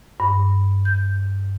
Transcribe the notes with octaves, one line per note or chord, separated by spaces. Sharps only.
G2
G6